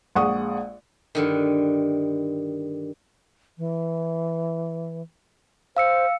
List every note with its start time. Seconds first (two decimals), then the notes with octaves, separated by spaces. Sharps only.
0.16 A#1 G#3 F#5 C#6 D#6
1.15 G2 D3 D#3
3.58 E3
5.77 C5 F5 E6 C#7